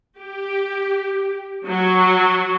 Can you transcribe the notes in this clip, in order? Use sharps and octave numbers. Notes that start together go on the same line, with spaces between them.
G4
F#3